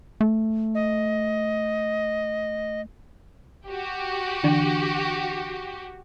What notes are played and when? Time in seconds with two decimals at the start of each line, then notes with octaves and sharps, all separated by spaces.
0.21 A3
0.75 D#5
3.67 F#4 G4
4.43 D3 E3 D4